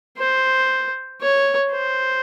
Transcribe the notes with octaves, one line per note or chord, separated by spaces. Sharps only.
C5
C#5
C5